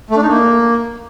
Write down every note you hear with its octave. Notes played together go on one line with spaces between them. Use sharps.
A3
D4
D#4
A#3